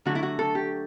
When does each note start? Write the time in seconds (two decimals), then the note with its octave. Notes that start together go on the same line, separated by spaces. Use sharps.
0.05 D3 F#3 A3 F#4
0.15 E4
0.23 F#4
0.39 A4
0.55 G4